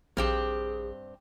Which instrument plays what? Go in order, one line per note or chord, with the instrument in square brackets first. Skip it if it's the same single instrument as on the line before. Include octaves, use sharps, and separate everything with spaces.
[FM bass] A#1 [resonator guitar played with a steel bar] G2 C4 G4 [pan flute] G#4